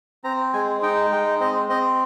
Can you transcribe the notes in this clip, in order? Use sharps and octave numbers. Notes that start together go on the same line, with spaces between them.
C4 A#5
G#3 G#5
D#4 G5
G#3 G5
C4 D#5
C4 D#5